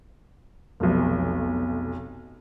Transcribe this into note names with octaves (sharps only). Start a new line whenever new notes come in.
F1 B1